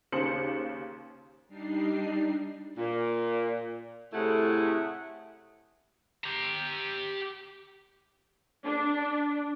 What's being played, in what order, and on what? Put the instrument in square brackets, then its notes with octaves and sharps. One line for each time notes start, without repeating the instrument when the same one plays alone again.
[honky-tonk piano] D#2 C#3 C5 C6 C#7 F#7
[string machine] G3 D4 D#4 C7
[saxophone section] A#2
A2 C3 A3 E4 G#4 F#5
[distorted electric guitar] G4 A#5
[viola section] D4